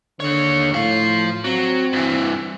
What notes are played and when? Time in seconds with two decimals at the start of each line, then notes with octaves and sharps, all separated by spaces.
0.20 D#2 D3 C#5
0.74 A2 F3 F5
1.45 F#3 C4
1.93 G2 E3